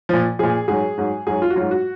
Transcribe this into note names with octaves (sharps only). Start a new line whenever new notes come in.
A#2 F3
A#2 F3 G#4
G#2 F#3 G#4
G#2 F#3
G#2 F#3 G#4
F4
F#4
G#2 F#3 F4
F#4